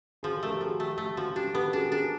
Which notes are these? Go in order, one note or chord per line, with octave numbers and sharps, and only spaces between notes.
F3 F#4 G#4
G4 A4
A3 A#4
G4 A4
F3 F#4 G#4
A3 G4
A3 G4
F3 F#4
F#4
D4 G4
B3 G4 A4
D4 F#4 G#4
D4 G#4 A#4